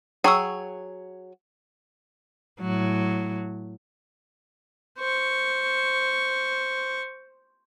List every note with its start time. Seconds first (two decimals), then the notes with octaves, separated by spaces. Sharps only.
0.24 F#3 G#4 G5 C#6 E6
2.60 A2 F#3
4.98 C5 C#6